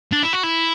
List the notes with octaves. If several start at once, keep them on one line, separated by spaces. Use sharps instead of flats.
D4
E4
F#4
E4